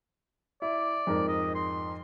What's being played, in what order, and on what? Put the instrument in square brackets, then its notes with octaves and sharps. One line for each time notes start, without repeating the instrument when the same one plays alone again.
[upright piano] E4 [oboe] D5
[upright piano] F2 G#2 A#4
[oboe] D#5
C6